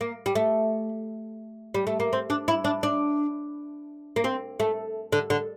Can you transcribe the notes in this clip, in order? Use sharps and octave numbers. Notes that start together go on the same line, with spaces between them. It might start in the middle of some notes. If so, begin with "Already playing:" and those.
A#3
G3
A3
G3
A3
A#3
C4
D4
E4
D4
D4
A#3
C4
A3
D3
D3